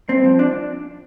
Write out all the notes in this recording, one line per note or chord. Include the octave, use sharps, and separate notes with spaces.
G2 C4
F3
D4